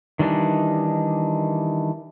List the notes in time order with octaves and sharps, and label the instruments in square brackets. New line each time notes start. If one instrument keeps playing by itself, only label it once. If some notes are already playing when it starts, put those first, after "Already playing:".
[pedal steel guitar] D#3 E3 G3 D4 D#4